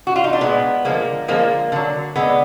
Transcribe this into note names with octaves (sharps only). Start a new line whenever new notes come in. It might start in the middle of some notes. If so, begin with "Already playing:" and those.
F#4
F4
D#4
D4
A#2 G#3 B3
D3 F3 G#3 A#3
D3 F3 G#3 A#3
D3 F#3
D3 G#3 B3